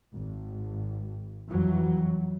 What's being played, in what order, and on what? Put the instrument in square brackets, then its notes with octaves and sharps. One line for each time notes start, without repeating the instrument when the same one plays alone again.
[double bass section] G#1
F2 E3 F#3